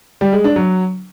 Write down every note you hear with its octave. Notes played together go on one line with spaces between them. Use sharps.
G3
G#3
D4
F#3